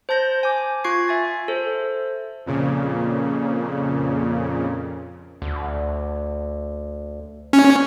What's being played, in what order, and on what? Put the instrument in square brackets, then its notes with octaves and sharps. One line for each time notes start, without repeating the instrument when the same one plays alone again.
[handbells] C5 A5 G6 A#6
G#5 D6
F4 C#6 G#6 C7
E5 G#5 A6
A4 C5 E5
[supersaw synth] F2 A#2 C#3
[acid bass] D2
[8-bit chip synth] C#4